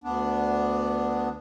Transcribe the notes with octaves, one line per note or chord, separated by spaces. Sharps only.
D2 B3 D4